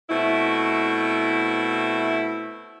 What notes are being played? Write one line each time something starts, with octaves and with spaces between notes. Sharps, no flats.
B2 A3 C4 E4